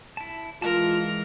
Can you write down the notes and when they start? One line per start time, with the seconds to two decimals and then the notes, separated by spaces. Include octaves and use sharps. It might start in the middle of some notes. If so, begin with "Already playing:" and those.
0.17 E4 A5
0.62 E3 G#3 F4 A#4 A5